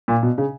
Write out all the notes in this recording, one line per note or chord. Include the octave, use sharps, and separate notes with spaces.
A#2
B2
C#3